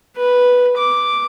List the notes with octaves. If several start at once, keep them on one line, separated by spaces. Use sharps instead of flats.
B4
D6